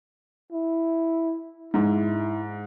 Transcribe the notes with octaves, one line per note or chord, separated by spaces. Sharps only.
E4
G#2 E4